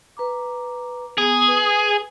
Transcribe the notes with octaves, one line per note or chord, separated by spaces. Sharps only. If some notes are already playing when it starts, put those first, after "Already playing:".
B4 A#5 D6
B3 G#4
B4